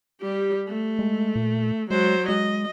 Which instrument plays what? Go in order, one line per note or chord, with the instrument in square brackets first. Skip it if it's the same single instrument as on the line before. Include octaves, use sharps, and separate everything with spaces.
[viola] G3 G4
A3
[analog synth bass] G#3
A#2
[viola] F#3 C5 [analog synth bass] G#3
[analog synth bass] G#3 [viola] D#5